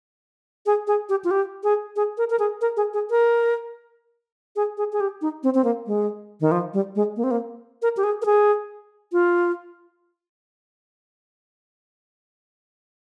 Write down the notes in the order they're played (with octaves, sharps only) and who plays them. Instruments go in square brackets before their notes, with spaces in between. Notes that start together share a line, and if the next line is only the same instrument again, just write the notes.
[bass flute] G#4
G#4
G4
F4
G4
G#4
G#4
A#4
A#4
G#4
A#4
G#4
G#4
A#4
G#4
G#4
G#4
G4
D#4
C4
C4
A#3
G#3
D#3
F3
G3
G#3
A#3
C4
A#3
A#4
G4
G#4
A#4
G#4
F4